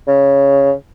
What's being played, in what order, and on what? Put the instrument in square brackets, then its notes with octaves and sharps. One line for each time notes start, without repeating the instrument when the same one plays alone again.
[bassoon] C#3